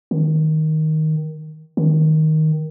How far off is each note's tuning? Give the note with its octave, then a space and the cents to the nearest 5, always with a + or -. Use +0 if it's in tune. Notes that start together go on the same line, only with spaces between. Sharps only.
D#3 +5
D#3 +5